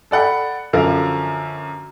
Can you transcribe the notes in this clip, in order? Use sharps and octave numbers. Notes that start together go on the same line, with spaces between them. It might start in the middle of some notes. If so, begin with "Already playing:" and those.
A4 D5 F#5 G5 B5
F#2 D3 F3 A#4 F5